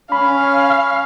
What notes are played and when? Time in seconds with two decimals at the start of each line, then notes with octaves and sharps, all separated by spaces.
0.12 C#4 F5 B5